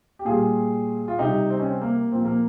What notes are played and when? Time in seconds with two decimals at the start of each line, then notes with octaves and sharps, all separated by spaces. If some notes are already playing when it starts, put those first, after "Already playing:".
0.19 G4
0.25 A#2 G3 F4 G#4
1.08 F4
1.18 C3 G3 D#4 G4
1.50 C4
1.60 C#4
1.69 C4
1.81 A#3
2.12 A#2 F3 C4
2.25 A#3